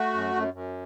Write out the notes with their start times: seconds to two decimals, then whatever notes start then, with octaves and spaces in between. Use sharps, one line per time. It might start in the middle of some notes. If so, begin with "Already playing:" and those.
Already playing: A3 F#4
0.13 F#2
0.35 F#2
0.54 F#2